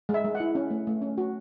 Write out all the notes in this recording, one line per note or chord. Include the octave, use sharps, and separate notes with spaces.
G#3
E5
G#3
F#5
E4
C#4
A3
A3
C#4
F#4